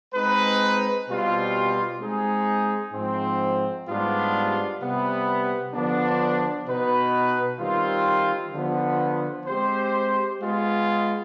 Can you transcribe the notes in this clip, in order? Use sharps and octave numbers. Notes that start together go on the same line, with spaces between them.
G#3 C4 D#4 B4
B2 G3 C4 F4
G#3 C4 D#4 G#4
G#2 F3 C4
G#2 G3 B3 D4 F4
C3 G3 B3
D3 F3 B3 D4
B2 B3 D#4 B4
D#3 G3 C4 F4
D3 F3 B3
G#3 C4 G4 C5
G#3 B3 F4